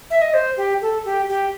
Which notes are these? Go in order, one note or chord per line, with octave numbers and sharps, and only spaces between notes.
E5
D#5
C5
G4
A4
G4
G4